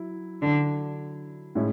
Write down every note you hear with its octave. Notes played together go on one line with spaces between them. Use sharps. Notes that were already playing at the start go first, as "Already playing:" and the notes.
Already playing: F#3 E4
D3
A2 G#3 C#4 E4